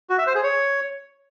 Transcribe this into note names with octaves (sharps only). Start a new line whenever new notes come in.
F#4
E5
C5
G#4
C#5